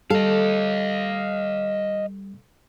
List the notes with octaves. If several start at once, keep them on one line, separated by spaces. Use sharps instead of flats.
G3 A4 D#5 F5